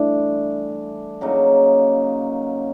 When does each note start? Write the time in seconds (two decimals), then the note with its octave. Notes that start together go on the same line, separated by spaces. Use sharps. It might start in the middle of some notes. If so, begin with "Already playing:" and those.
Already playing: G2 E3 A3 D4
1.21 C#3 F#3 A#3 D#4